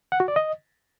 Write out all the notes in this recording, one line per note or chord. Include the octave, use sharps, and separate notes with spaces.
F#5
F#4
D5
D#5